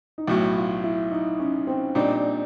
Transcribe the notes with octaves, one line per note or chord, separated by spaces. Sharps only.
D#4
B1 A2 F#3 E4
F4
E4
D#4
C#4
C4
A#2 G3 C4 D4 D#4